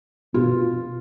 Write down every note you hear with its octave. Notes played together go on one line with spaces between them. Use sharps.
B2 F4